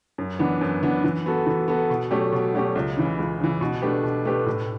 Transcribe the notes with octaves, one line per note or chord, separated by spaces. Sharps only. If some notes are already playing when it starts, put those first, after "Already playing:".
F#2
E3 B3 D4
F#2
E3 B3 D4
E3
B3 F#4 A4
E3
B3 F#4 A4
B2
F#3 A3 C#4 G4
B2
F#3 A3 C#4 G4
C#2
C#3 E3
C#2
C#3 E3
B2
A3 D4 G4 B4
B2
A3 D4 G4 B4
A2